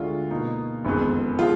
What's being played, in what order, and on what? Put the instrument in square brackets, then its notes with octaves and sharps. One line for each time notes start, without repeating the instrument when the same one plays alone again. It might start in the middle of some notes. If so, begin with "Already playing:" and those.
Already playing: [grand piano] D2 D3 G#3 D4 F#4 [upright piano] F4
[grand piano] B2 A#3 D#4
F#1 F2 D#3 G#3 B3
[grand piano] F3 G#3 [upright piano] F4